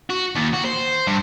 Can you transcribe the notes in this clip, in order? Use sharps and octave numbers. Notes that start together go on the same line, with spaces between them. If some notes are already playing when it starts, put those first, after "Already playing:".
F#4
D#2
F#4
C5
G2